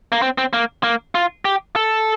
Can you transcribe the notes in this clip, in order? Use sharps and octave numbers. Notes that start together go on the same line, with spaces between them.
A#3
C4
C4
A#3
A#3
F4
G4
A4